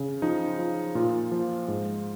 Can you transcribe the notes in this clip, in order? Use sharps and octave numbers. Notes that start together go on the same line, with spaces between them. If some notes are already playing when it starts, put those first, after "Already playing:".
Already playing: C#3
F3 D#4
F3
A#2 F4
F3
G#2